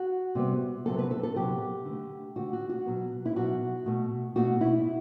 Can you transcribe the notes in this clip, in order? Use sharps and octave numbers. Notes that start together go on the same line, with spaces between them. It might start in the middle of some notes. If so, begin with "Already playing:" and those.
Already playing: F#4
C3 G3 B3
C3 F#3 B3 A4
B4
A4
A4
C3 F#3 B3 G4
D3 A3
D3 A3 F#4
F#4
F#4
B2 F#3 B3
E4
B2 F#3 B3 F#4
B2 A3
B2 A3 F#4
E4